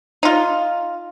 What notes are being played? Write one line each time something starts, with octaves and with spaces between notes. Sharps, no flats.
D#4 F4